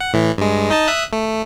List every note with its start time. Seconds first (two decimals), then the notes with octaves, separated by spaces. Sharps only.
0.01 F#5
0.13 A2 E3
0.38 G2 G#3
0.70 D#4 D#5 A5
0.88 E5 D#6 F#6
1.13 A3